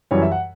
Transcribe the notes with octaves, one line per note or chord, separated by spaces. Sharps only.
F#2 E3 G3 C#5
E5
F#5